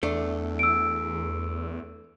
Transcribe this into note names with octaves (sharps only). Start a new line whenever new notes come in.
E2 A3 D4
E6 D7